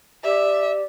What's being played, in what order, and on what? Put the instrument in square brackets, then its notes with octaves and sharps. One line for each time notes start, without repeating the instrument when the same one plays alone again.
[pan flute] G4 [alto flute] D5 [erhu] E5